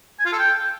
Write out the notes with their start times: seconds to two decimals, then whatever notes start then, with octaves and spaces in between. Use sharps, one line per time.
0.19 G#5
0.26 F4
0.32 A4
0.39 G5